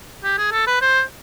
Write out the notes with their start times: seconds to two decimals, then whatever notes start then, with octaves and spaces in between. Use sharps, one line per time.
0.24 G4
0.38 G#4
0.52 A4
0.67 B4
0.81 C5